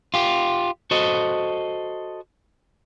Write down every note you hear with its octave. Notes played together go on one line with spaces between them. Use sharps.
F4 G4
F#4 A4 C5 D#5